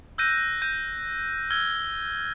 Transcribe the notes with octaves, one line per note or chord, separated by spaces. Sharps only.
E6 F#6 G6 A#6 D#7
G6 D#7
E6 F6 G#6 G7